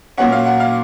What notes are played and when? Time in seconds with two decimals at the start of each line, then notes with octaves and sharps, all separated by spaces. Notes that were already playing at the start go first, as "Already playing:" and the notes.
0.18 A#2 F#3 A#3 C#4 F#5
0.32 F5
0.46 F#5
0.60 F5